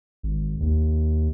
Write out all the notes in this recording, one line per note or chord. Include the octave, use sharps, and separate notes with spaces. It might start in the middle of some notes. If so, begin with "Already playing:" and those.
G#1
D#2